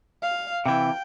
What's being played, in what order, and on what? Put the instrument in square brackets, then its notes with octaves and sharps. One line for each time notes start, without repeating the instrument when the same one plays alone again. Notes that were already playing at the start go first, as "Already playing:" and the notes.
[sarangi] F5
[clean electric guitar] C3 E3 [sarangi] G5